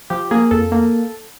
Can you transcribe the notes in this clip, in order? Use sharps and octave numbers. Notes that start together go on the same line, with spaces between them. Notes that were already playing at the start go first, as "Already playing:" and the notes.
F3 G4
A#3 G#4
F2 A4
A#3